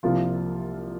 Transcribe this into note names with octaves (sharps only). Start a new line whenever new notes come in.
C2 C3 F3 A#3 F4